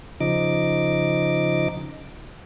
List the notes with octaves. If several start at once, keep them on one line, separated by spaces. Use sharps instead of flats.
C#3 F3 D#4 D#5 D6